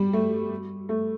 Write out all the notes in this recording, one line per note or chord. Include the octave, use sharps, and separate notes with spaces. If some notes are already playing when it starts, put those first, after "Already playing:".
Already playing: G3
A3
A3